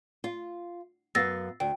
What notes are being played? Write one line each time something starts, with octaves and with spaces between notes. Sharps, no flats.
F4
F#2 B3 F5 E6 A6 A#6
D2 G5